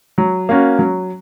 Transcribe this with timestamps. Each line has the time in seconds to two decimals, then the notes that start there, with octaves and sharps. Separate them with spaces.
0.18 F#3
0.49 A#3 C#4 F#4
0.79 F#3